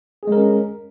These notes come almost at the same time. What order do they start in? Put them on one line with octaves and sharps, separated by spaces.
G#4 G#3 A#4 C#4